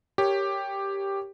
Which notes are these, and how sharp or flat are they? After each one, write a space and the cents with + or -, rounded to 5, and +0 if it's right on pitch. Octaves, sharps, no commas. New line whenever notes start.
G4 +5 A#4 -10 C#5 +0